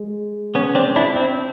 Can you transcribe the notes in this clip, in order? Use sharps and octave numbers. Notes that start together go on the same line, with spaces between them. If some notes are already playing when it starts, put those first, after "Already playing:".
Already playing: G#3
B3 C#4
C4 D4
D4 E4
C4